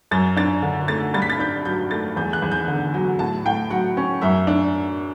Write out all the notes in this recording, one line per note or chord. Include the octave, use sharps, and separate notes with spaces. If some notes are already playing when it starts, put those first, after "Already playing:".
F#2 A6
D4 A6
D3
A3 A6
G2 A6
B6
A6
D4 G6
F#3 G6
A3 A6
E2 G6
F#6
E2
G6
D3
F#3
A2 A5
A2 G5
F#3 F#5
C#4
F#2 E5
D4